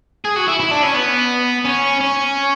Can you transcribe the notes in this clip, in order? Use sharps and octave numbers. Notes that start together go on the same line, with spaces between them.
G#4
F#4
E4
E4
D4
C#4
B3
C#4
C#4